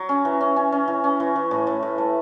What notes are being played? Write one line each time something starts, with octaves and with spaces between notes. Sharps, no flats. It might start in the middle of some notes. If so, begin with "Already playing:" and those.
Already playing: F#3
C#4
E3
C#4
C#4
C#4
E3
C#4
E3
E3
A2
A2
A2
A3